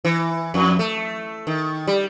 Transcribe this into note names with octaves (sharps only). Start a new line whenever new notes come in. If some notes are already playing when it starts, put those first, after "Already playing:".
E3
F2
A3
D#3
G3